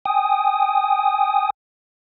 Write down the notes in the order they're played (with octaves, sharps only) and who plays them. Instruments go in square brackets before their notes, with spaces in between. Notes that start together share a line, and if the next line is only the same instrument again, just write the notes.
[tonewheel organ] G5 G#5 D#6